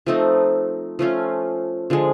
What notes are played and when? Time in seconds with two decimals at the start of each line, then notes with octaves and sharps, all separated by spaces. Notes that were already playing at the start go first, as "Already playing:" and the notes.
0.06 F3 A3 C4 D#4
0.99 F3 A3 C#4 F4
1.90 D3 F3 G#3